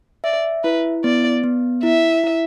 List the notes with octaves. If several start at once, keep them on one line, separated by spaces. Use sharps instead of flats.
D5 E5
E4 B4
B3 D5
B3
E4 E5
E4